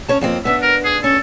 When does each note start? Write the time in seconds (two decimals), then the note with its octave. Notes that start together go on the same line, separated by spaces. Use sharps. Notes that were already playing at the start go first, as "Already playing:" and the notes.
0.08 C#4 C#5 A5
0.21 F2 A#3 C4
0.45 B3 C#4 D4 E5
0.62 A#4
0.85 G#4
1.04 C#4 A4